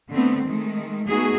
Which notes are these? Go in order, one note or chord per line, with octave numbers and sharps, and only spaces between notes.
D3 A3 B3 C4
D#3 G#3 A3
G#3 A3 B3 D#4 F#4 G#4